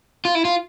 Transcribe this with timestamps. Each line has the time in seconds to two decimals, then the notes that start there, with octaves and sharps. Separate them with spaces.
0.25 F4
0.35 E4
0.45 F4